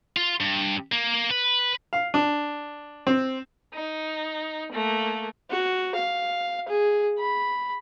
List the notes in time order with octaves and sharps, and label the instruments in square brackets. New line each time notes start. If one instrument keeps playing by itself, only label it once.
[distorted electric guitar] F4
G2
A#3
B4
[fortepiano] F5
D4
C4
[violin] D#4
A3 A#3
[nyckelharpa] F#4
F5
G#4
B5